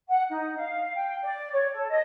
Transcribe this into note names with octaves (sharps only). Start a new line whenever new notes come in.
F#5
D#4
F5
G5
D5
C#5
A4
D#5